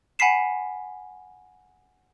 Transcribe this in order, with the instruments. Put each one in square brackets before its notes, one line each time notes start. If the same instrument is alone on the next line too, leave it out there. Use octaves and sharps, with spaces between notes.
[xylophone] F#5 G#5 B5 B6 C7 E7